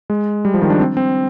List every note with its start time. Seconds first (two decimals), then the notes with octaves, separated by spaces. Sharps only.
0.10 G#3
0.45 G3
0.54 F3
0.62 D#3
0.70 D4
0.79 C4
0.97 C4